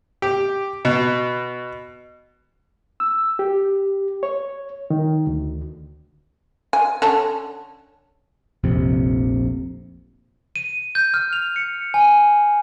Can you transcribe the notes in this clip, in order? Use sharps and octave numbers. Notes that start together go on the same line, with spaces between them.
G4
B2
E6
G4
C#5
D#3
D2
G#5
D3 C#4 A5
F1 A#1 F2 C3
D#7
G6
F6
F7
C#7
G#5